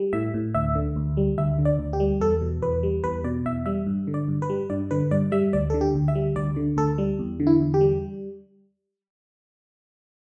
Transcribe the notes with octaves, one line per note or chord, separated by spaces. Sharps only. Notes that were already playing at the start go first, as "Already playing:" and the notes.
Already playing: G3
A2 E5
A2
D2 E5
D3
D2
G3
D2 E5
D3
D5
D2
G4
G3
E2 A4
B2
E2 B4
G3
E2 B4
B2 D5
E2 E5
G3 E5
G2
D3
D5
G2
B4
G3
G2 D5
D3 B4
G2 D5
G3 E5
D2 D5
D3 A4
G4
D2
E5
G3
D2 D5
D3
D2 A4
G3
E2
D3
E4
E2
G4
G3